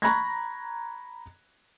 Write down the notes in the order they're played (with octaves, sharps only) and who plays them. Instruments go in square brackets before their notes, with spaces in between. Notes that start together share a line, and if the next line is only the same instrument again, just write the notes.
[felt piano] A#5 B5 C#6 F#6 G#6 A#6